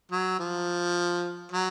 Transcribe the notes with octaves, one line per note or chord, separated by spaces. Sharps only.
F#3
F3
F#3